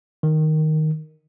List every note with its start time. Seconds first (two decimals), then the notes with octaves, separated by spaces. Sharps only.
0.23 D#3